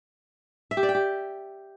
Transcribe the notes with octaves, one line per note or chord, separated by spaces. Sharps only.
E5
G4
D5
G5
G4